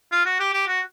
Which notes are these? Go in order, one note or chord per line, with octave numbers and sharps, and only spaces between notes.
F4
F#4
G4
G4
F#4